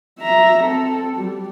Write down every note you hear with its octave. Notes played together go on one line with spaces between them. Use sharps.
E5 A#5
C4 A4
G3